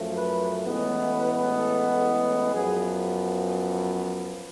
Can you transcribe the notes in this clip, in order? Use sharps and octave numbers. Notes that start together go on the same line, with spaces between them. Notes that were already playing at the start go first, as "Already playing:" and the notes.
Already playing: F#2 F3 A3
B4
A1 A2 G#3 B3
B4
A4
F#2 F3 B3 G#4